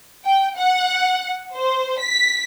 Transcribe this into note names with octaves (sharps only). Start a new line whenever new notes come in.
G5
F#5
C5
B6